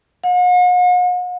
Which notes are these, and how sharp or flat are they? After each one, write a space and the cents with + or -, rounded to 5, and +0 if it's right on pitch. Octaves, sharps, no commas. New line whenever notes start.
F#5 -45